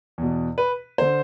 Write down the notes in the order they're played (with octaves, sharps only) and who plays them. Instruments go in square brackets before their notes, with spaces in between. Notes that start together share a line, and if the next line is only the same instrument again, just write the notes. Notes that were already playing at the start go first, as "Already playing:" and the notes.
[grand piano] E2 B2
B4
D3 C5